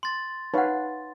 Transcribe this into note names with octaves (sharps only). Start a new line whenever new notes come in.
C6 A6
D#4 B4 C#5 F5 F#5